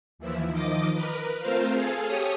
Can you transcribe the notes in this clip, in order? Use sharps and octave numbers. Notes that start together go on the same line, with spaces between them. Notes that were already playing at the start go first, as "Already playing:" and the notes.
D#2 E3 F3 E4
D#3 F3 D#5 D6
A#4 B4
A3 C4 F4 A#4 C5 F5
G#4 A4 F5 G#5
G4 A4 C#5 D#6